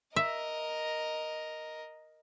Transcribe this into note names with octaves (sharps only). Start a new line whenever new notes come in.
A#4 D#5 E5